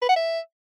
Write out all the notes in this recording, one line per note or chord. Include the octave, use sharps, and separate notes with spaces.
B4
F#5
E5